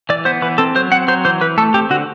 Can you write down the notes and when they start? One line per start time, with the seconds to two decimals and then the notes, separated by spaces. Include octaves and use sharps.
0.09 E3 D5
0.25 B3 C5
0.42 E3 B4
0.58 C4 A4
0.75 F#3 C5
0.91 C4 F#5
1.08 F#3 C5
1.25 E3 C5
1.41 E3 B4
1.58 A3 A4
1.74 C4 G4
1.90 D3 F#4